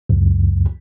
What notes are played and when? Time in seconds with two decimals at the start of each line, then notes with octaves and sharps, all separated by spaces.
0.10 C#2 F#2